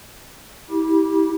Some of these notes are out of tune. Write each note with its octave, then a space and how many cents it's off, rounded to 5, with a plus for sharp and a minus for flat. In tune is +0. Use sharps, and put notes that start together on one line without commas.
E4 -30 G4 +0